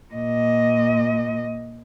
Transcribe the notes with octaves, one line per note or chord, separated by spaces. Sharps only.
A#2 D#5